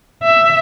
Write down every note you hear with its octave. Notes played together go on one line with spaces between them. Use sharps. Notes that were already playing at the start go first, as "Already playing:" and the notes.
E5